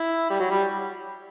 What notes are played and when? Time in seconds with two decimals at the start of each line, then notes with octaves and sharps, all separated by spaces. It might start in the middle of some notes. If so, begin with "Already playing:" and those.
Already playing: E4
0.30 G3
0.40 F#3
0.50 G3